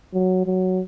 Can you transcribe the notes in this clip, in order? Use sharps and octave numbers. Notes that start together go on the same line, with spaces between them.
F#3
F#3